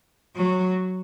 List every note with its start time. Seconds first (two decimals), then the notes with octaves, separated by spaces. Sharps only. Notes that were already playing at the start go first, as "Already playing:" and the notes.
0.36 F#3